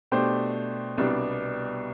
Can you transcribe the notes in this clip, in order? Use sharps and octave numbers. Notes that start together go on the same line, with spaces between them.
B2 A3 D4 G4 C5
C2 B2 G3 B3 D4